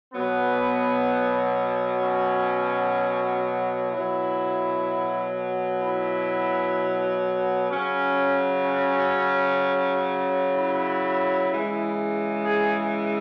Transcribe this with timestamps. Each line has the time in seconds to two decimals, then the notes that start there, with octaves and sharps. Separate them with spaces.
0.13 B2 F#3 B3
2.03 C#4
3.91 B2 F#3 E4
5.81 E4
7.71 C#3 F#3 C#4
8.66 C#4
10.55 E4
11.49 C#3 E3 G#3
12.45 G#4